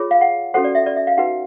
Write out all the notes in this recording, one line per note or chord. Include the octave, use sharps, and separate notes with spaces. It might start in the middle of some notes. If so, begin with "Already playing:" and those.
Already playing: F4 G#4 C#5
F5
F#5
C#4 F#4 A4 C5 F#5
D5
E5
D5
E5
F5
D#4 F#4 B4 F#5